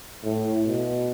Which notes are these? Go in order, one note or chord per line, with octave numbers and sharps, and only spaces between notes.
A2
B2